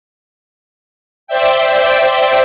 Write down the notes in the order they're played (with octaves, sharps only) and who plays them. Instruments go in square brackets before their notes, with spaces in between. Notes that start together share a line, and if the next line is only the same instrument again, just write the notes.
[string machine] C5 D5 E5 G5